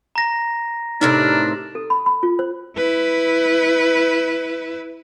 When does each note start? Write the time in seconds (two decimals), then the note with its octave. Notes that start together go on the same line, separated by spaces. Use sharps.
0.15 A#5 A#6
1.01 A2 C3 D4 D#4 A#4
1.75 A4
1.90 B5
2.06 B5
2.23 F4
2.39 C5
2.77 E4 B4